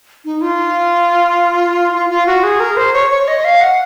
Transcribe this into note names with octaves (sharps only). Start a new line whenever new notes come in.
D#4
F4
F4
F4
F#4
G#4
A#4
C5
C#5
C#5
D#5
F5
F#5